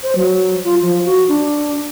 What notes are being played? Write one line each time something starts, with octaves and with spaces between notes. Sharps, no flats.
C5
F#3
F4
F3
F#4
D4